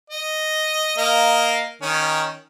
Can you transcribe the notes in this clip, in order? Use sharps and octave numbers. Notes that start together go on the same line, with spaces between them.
D#5
A#3 D#5 F5
D#3 C#4